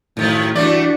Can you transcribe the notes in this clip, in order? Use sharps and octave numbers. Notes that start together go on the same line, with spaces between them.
F#2 A2 D#3 F3
E3 G3 A3 D4 F#4 D5